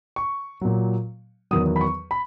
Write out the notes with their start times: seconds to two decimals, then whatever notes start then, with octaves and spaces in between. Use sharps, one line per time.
0.16 C#6
0.61 A#2 F#3
1.51 E2 D#3 F#3 D#6
1.76 B5
1.81 C#6
2.11 B5